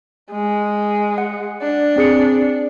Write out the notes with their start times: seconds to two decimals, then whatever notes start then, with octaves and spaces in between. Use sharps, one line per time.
0.31 G#3
1.18 F#5
1.62 D4
1.96 C4 G#4 C#7